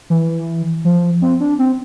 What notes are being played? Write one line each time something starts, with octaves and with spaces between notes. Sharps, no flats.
E3
F3
C4
D4
C4